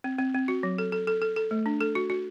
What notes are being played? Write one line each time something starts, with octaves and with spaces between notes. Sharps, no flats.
C4
C4
C4
F#4
F#3
A4
A4
A4
A4
A4
A3
D4
A4
F#4
F#4